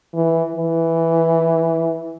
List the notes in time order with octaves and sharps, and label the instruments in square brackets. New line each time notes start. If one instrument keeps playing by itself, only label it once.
[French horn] E3
E3